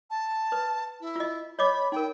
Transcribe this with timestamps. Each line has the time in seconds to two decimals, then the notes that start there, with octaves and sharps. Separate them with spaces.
0.10 A5
0.52 B4
1.00 E4
1.16 F4 D#5
1.59 C#5 D#5 B5 D6
1.92 D#4 A#4 G5